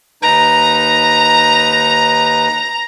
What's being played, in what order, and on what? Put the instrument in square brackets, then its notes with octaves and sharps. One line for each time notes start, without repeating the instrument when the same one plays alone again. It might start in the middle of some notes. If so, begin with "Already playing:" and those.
[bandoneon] D#2 D#4 B4 [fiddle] A#5